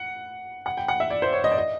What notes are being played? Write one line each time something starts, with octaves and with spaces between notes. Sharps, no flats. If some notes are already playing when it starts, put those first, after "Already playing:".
Already playing: F#5
F#5
G5
F#5
E5
D5
C5
C#5
D#5
D5
D#5